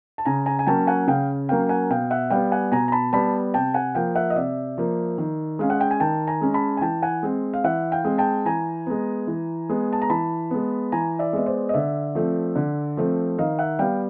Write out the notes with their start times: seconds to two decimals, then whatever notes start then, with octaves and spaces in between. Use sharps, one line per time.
0.18 A5
0.25 C#3 G#5 A#5
0.46 G#5 A#5
0.59 G#5
0.67 F#3 A#3 C#4 G5 A5
0.87 F#5 G#5
1.07 C#3 F5 G5
1.49 F#3 A#3 C#4 F5 G5
1.69 F#5 G#5
1.90 B2 F5 G5
2.11 E5 F#5
2.30 G3 B3 F5 G5
2.52 F#5 G#5
2.72 B2 G#5 A#5
2.88 A#5
2.92 A5 B5
3.13 G3 B3 A5 B5
3.54 C3 G5 A5
3.74 F#5 G#5
3.94 F3 A#3 F5 G5
4.16 E5 F#5
4.30 D#5
4.36 C3 D5 E5
4.78 F3 A#3
5.18 D#3
5.59 G#3 C#4 F5
5.70 F#5
5.81 G5
5.91 G#5
6.00 D#3 G5 A5
6.27 G#5 A#5
6.41 G#3 C#4
6.54 A5 B5
6.77 G#5
6.81 E3 G5 A5
7.03 F#5 G#5
7.23 G#3 C4
7.54 F5
7.64 E3 E5 F#5
7.92 F5 G5
8.05 G#3 C4
8.18 G5 A5
8.45 E3 G#5 A#5
8.86 G#3 B3
9.27 E3
9.69 G#3 B3
9.93 A5
10.02 A#5
10.10 E3 A5 B5
10.51 G#3 B3
10.92 E3 G#5 A#5
11.19 D5 E5
11.33 G#3 B3 D#5
11.46 C5 D5
11.69 D#5
11.74 D3 D5 E5
12.15 F3 A3 C4
12.56 D3
12.97 F3 A3 C4
13.38 D#3 D#5 F5
13.59 E5 F#5
13.79 G3 B3 F5 G5